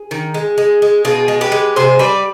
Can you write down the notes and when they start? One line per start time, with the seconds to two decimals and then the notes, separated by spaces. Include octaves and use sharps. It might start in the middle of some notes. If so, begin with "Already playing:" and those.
Already playing: G#4
0.11 D#3
0.34 G#3
0.58 G#3
0.82 G#3
1.05 B2 F4 G#4
1.28 G#3
1.41 G4 B4
1.52 G#3
1.76 C3 G#4 C5
1.99 G3 B4 D5